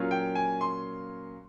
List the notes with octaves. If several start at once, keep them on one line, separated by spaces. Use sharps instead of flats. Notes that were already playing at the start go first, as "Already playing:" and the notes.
Already playing: A#2 F#3 A#3 C#4 F4
G5
G#5
C6